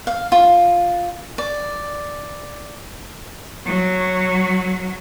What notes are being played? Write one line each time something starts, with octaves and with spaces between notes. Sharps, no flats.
F5
F4
D5
F#3